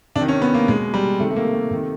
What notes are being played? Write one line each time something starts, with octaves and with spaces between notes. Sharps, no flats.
C3 D4
D#3
C#4
B3
A#3
B2 G#3
G3
C3 D#3 A3
A3
A#3
A3
C3 D#3